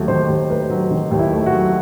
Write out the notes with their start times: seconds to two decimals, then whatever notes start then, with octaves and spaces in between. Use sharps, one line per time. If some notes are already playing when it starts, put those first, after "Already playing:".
Already playing: D#2 F#3 A3
0.08 D#3 C5
0.29 D#2
0.49 A3 B4
0.70 F#3
0.91 D#3
1.11 D#2
1.19 E4
1.32 A3
1.46 F#4
1.54 F#3